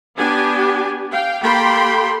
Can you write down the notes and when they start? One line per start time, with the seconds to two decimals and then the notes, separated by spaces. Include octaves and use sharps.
0.17 B3 D4 G4 G#5
1.11 F5 G5
1.41 A#3 G4 A4 G5 B5 C6